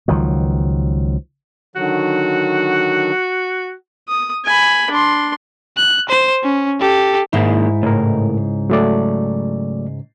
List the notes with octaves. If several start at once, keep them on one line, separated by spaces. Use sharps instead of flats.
C#2 D#3 F3 F#3
D3 D#3 F#3 F#4
D#6
G#5 B5
D4 C6
F#6
C5
C#4
G4 A4
G#2 D#3 G#3 A#3 E4
C#2 A2 A#4
F#3 A3 D5